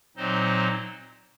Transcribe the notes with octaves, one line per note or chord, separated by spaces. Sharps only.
A#2 F#3 C4 D#4 C5 D#5